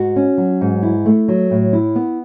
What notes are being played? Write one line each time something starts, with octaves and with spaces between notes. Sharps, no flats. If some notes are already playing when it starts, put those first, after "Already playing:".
Already playing: G#2 F#4
C#4
F#3
G#2
E4
A3
F#3
A2
E4
B3